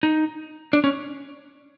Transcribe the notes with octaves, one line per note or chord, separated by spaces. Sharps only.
D#4
D4
C#4